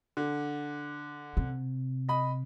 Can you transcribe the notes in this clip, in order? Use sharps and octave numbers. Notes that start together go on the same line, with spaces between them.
D3
C3
D#5 B5